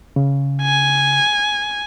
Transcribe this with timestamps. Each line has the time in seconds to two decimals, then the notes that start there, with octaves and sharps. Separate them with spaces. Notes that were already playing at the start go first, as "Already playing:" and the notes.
0.16 C#3
0.62 G#5